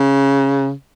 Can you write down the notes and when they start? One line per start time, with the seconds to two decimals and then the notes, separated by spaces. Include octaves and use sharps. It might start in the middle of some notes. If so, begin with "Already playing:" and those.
Already playing: C#3